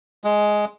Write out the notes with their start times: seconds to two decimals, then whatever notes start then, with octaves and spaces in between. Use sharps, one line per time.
0.24 G#3